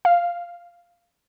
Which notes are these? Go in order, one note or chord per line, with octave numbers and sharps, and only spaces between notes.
F5